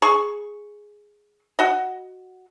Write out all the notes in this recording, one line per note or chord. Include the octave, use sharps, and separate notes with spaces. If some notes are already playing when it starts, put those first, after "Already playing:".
G#4 C#6
F#4 D#5